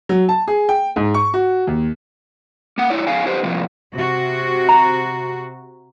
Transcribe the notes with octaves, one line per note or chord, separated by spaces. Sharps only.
F#3
A5
G#4
G5
G#2
C#6
F#4
D#2
A#3 F#5
D#4 E4 C#5 D5
B3 D#4 G#4 F5 G#5
D#4 G4 B4 C5
A2 C3 F3 A3 A#3
C3 F#4
A#5